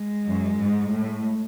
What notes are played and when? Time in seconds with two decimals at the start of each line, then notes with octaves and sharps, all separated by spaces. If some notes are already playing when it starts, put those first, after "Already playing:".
Already playing: G#3
0.25 F#2
0.58 G#2
0.91 A2